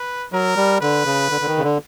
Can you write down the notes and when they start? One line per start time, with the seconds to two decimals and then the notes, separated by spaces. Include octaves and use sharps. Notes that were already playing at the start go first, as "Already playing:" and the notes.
Already playing: B4
0.32 F#3 A#4
0.56 G3
0.81 D3 B4
1.06 C#3
1.30 D3
1.41 D3
1.47 D#3
1.58 C#3
1.63 D3